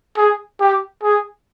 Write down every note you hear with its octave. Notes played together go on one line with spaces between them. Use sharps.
G#4
G4
G#4